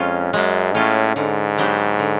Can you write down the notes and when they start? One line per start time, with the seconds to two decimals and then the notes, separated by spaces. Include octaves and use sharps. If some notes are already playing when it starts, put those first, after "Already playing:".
Already playing: F2 G#3 C#4 F4
0.33 F#2 G#3
0.75 A2 C#4 F4
1.16 G#2 D3
1.58 F#3 B3 D4 G4
1.99 D3